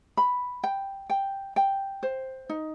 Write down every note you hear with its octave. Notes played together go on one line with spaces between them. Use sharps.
B5
G5
G5
G5
C5
D#4